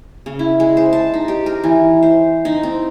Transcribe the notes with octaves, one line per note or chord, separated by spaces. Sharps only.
C#3
E4
G#3
C5
A5
D#4
G4
A#4
E3
C5
D#4
C4